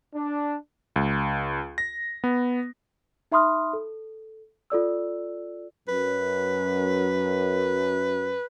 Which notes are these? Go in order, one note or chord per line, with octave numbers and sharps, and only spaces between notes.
D4
C#2
A#6
B3
D#4 E5 B5 C6 D#6 F6
A4
F4 A4 D5 E6
F#2 B4